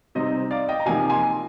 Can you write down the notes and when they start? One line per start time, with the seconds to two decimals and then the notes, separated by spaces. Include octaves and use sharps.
0.15 C3 G3 C4 D#4 C5 D#5
0.51 D5 F5
0.69 D#5 G5
0.80 A#5
0.86 C3 F3 A#3 D#4 F5 G#5
1.10 G#5 C6